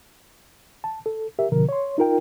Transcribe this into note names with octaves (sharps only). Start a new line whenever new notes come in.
A5
A4
G4 A#4 E5
B2 D3 F3 A#4
C#5 C6
D#4 F4 A#4 G5